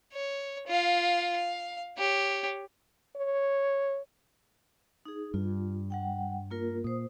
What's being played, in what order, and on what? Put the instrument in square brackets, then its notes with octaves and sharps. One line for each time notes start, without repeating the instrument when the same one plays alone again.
[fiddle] C#5
F4 F5
F5
G4 C#5
[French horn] C#5
[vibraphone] D#4 G#4
[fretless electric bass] G2 [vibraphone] F4
[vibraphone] G3 F#5 G5
A#3 F4 A#4
[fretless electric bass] A#2 [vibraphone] C5 D#6